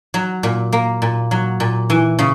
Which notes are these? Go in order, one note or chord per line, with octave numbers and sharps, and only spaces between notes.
F#3
A#2
A#3
A#2
F#3
A#2
E3
C#3